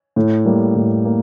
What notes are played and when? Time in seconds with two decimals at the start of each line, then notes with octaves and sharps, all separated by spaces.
0.16 A2
0.45 G3 A#3
0.76 A2
1.05 A#3